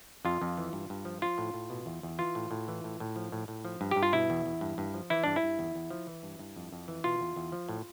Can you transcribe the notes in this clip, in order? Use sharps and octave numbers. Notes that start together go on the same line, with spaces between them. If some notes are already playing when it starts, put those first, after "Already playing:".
F2 F4
F2
E3
G2
G2
F3
F3 F4
A2
A2
B2
E2
E2
E3 F4
A2
A2
E3
A2
A2
F3
A2
A2
F3
G2
G2 G4
F4
B2 E4
E2
E2
G2
G2
F3
E3 E4
G2 D4
E4
G2
E2
E2
F3
E3
G2
G2
F2
F2
E3
B2 F4
E2
E2
F3
A2